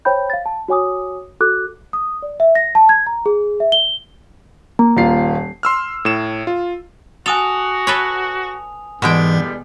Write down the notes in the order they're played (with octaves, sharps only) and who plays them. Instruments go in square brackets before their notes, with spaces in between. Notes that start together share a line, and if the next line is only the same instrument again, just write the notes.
[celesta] C5 C#5 G5 B5 G6
F5 A6
A5
F#4 C#5 G#5 D6 D#6
F#4 A4 D6 F#6
D#6
D5
E5
A#6
A5
G#6
A#5
G#4
E5
G7
[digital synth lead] A#3
[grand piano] D#1 F4 C7
[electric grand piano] C6 E6 F6
A2 E7
F4
[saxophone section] F#4 [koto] A4 [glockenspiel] G#5 D#6 F7
[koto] A4 B4 C#5
[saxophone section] E2 D3 G3 [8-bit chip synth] G#2 E3 [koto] B2 G#3 G5